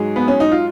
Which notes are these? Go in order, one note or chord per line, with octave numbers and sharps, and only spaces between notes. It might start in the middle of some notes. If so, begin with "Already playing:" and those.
Already playing: G#2 F#3 G#4
B3
C#4
D#4
F4